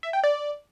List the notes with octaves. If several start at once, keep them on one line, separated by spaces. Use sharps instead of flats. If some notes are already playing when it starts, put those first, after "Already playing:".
E5
G5
D5